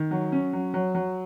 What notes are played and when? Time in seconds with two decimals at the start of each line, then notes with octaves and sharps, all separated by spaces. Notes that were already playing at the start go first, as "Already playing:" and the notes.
Already playing: D#3
0.11 F#3
0.32 C#4
0.53 F#3
0.74 F#3
0.95 F#3